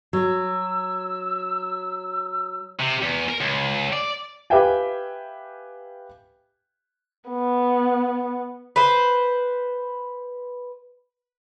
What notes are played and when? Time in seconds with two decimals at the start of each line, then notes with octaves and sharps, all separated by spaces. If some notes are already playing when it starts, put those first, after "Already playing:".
0.13 F#3 E6
2.80 C3
3.02 E2
3.29 A#4
3.40 C#2
3.93 D5
4.50 G4 B4 E5 F5 G5 G#5
7.29 B3
8.76 B4 C5